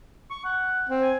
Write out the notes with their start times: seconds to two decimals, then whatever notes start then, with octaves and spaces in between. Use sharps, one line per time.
0.30 C#6
0.45 F#5
0.89 C4
1.02 G#5